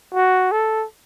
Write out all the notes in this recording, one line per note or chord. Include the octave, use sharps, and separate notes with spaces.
F#4
A4